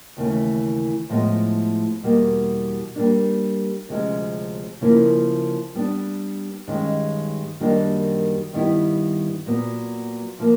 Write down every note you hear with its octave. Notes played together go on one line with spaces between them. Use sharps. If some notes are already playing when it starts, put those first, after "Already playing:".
D#2 C#3 E3 A3
A2 F3 G#3 B3
E2 B2 G3 A#3
G3 A#3 D4
D2 C3 F3 G#3 C#4
C#3 F3 A#3 C#4 E4
G3 B3 D4
G2 D#3 G#3 C#4
F#2 D#3 G3 A#3 D4
G2 D#3 G3 B3 E4
A#2 F#3 B3
C3 F3 A#3